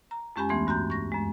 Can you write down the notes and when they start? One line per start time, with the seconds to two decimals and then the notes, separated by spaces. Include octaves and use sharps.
0.11 A#5
0.36 F2 G#3 C#4 G4 G#5 B5
0.49 D2 E3 A3 B3 C6
0.67 G2 F#4 A#5 G6
0.90 C#6 A#6
1.12 F#2 G#3